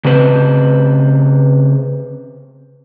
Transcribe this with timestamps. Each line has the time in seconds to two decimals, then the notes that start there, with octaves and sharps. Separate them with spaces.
0.05 C#3 C4 B4 C5